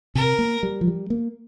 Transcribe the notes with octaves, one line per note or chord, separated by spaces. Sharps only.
C3 A#4
A#3
G3
F3
G3
A#3